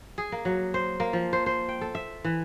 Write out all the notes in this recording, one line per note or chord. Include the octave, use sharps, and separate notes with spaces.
G#4
A#3
F#3
C5
A#3
F3
C5
C5
G5
A4
E5
E3